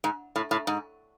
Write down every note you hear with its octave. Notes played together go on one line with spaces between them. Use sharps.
G#2
A2
A2
G#2